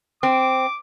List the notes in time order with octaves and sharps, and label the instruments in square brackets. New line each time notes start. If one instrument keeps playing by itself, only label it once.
[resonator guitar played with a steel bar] C4 [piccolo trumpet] D6